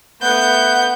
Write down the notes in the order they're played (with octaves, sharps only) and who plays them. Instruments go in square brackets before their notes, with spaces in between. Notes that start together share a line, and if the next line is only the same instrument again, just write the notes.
[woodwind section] A3 F#5 [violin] B3 G6